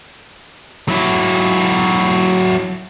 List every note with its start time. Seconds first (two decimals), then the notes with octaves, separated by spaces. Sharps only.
0.89 F#3 E4